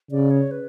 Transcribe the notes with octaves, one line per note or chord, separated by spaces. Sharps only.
C#3 D5
C#5
B4